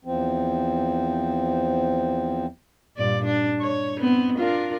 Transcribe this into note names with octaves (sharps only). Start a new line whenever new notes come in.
E2 F3 C4
G2 A#2 D5
D4
C#5
B3 C4
D4 F4 A#4